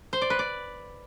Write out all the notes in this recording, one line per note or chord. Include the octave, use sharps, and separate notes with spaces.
C5
D5
B4
D5